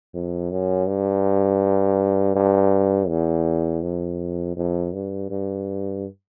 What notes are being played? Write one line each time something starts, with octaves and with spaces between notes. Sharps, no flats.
F2
F#2
G2
G2
E2
F2
F2
G2
G2